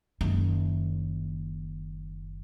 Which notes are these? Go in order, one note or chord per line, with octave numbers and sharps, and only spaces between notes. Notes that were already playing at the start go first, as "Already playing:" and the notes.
F#1 D#3